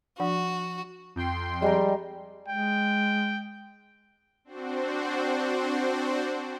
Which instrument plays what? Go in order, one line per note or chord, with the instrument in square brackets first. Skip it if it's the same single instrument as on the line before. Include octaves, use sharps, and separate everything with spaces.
[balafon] F3 D4 F#5 [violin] F#4
[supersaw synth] F2 G5 C6
[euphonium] G3 [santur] G#3 A#5
[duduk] G#3 [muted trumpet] G5
[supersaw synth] C4 D4 F#4 C5